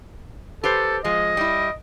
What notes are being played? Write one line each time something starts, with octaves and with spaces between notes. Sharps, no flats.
G4 A4 B4 C5
F3 G#3 D#5
G3 E4